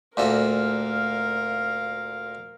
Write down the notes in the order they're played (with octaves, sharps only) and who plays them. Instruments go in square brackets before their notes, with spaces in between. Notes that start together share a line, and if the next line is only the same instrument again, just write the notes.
[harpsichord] D2 A#2 A4 [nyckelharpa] A#4 F5